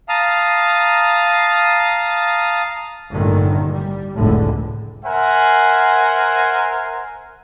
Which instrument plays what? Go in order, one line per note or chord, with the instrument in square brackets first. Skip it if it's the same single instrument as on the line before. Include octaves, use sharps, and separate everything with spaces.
[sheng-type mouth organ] F5 A5 A#5 D#6
[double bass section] A1 G2 A#2 D3 D#3
G3
F1 C#2 A2 D3
[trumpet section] A#4 C5 E5 F#5 G#5